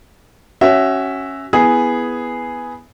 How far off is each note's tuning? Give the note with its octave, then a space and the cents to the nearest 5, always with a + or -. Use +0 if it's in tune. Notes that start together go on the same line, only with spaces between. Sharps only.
C#4 -10 F#4 +20 E5 +0
B3 +0 E4 +0 G#4 +0